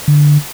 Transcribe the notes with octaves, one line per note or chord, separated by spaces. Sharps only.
D3